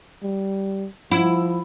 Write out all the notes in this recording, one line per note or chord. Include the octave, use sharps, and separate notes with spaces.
G3
F3 E4